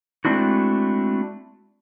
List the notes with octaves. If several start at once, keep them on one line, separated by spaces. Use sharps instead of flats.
G#3 A3 C4 D4 E4 F#4